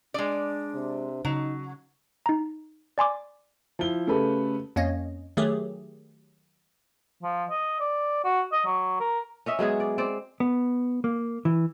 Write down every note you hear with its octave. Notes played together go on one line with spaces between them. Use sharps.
G#3 D4 D5
C3
C#3 F#3 D#4
D#4 A#5
D5 G#5 C6 D6
F3 E4 G7
C#3 A3 G4 A4 B4
F2 A#3 C#4 C#5 D#5
D#3 F#3 A3 G4 G#4
F3
D#5
D5
F#4
D#5
F#3
A#4
C#4 D#5 E5
F#3 G#3 B3 G#4
D5
C4 D5
B3
A#3
E3